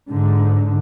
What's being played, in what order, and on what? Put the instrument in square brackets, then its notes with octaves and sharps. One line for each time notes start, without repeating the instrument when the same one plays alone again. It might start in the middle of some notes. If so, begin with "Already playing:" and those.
[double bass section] G#2 D3